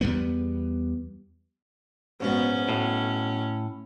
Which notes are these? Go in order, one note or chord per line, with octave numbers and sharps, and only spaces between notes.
E2 G3 B3
A#1 G#2 B2 C#4
B1 A2